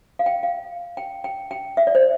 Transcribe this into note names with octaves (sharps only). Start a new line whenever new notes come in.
F5
G5
F5
G5
G5
G5
E5
D5
C5